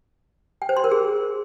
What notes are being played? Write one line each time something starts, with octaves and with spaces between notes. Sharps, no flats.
G5
C5
C6
A#4
G#4